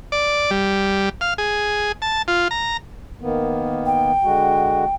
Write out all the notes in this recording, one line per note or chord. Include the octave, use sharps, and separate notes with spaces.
D5
G3
F5
G#4
A5
F4
A#5
D#3 A#3 B3
G5
D3 G#3 F#4